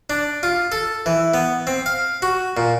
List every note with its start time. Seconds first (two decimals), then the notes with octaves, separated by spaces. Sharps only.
0.10 D4
0.43 F4
0.72 A4
1.06 E3
1.34 B3
1.67 C4
1.86 F5
2.22 F#4
2.57 A#2